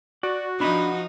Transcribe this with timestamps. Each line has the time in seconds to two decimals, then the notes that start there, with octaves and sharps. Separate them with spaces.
0.23 F#4 D5
0.60 F3 D4 D#4 B5